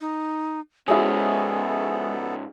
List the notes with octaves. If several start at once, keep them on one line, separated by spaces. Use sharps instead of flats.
D#4
G#2 G#3 B3 C#4 E4 F#4 G#4 A4